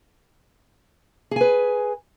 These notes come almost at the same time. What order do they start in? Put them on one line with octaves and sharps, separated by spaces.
G#4 G#5 B4